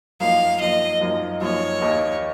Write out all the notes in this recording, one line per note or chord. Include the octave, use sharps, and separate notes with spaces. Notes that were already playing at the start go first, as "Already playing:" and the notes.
F#2 F3 A#3 D#4 F5
F#2 F3 A#3 D#4 D#5
F#2 F3 A#3 D#4
F#2 F3 A#3 D#4 C#5
D#2 D#3 A#3 D#4